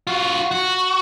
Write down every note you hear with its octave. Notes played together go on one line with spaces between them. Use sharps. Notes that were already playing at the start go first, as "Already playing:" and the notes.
F4 F#4
F#4